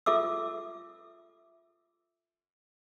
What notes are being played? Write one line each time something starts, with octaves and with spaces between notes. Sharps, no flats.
F4 A4 E5 D6 E6